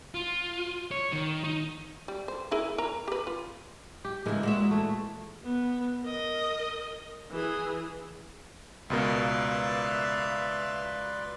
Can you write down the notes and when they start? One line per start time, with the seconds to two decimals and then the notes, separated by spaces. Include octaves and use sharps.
0.14 F4
0.91 C#5
1.13 D#3
1.44 D#4
2.08 G3
2.28 C5
2.51 E4 G#4 A#4
2.78 A#4 A#5
3.08 G4 B4
3.27 F4
4.05 G4
4.26 C#3 E3 G#3 A#3
4.43 A#2 G#3 F#4 E5
4.71 E3 A3
5.44 B3
6.01 A#4 D#5
7.31 E3 G#4
8.90 C#2 B2 A#4 B4 D5 E5 F5 C6